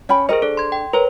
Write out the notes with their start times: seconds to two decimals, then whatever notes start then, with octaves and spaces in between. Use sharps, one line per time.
0.09 C#4 G5 B5
0.29 G#4 A#4 C5 D#5
0.42 D4 A4
0.57 C6 G#6
0.72 G5
0.93 A#4 B4 C#5